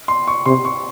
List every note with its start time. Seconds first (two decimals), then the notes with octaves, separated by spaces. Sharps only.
0.08 C6
0.27 C#6
0.46 C3 C6
0.65 C#6